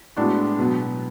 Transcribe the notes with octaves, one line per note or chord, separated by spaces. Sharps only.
A2 G#3 B3 D4 F#4
B2 F#3 B3